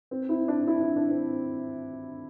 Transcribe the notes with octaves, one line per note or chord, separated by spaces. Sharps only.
C4
E4
D4
E4
D4
D4
C4